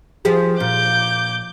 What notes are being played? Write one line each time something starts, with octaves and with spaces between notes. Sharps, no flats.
F3 G4 G#4
A#2 D6 G6